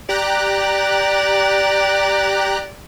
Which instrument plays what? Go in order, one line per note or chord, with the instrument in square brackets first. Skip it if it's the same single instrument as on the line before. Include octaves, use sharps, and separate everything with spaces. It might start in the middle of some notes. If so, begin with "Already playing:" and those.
[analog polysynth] G4 A#5 F#6 [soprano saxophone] D5